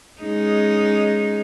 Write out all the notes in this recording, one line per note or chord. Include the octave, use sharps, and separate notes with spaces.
G#3 C#4 D#4